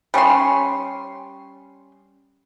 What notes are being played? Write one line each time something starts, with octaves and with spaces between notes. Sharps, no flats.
G3 C#4 C#5 C6